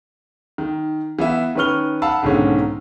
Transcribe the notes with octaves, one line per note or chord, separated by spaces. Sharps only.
D#3
E3 B3 E5 F5
D#3 C#4 B4 C#6 F6 G7
F5 F#5 A5 B5 E6
B1 G#2 D3 D#3 C#4